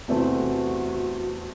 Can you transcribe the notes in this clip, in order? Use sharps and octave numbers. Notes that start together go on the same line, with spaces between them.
E2 C3 E3 A3 C4 F#4